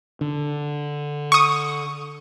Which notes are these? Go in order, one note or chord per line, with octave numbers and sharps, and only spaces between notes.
D3
C#6 D#6